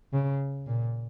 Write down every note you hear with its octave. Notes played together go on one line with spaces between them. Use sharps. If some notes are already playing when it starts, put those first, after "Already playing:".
C#3
A#2